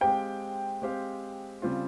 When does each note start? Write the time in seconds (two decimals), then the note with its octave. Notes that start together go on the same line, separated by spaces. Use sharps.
0.01 G#3 C4 G4 C5 F5 G5
0.82 G#3 C4 G4 C5 F5
1.62 C#3 G3 C4 F4